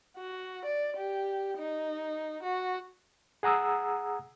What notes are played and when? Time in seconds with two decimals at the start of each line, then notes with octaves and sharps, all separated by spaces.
0.17 F#4
0.65 D5
0.97 G4
1.58 D#4
2.43 F#4
3.43 G#4 F#5 A#5 D#6 E6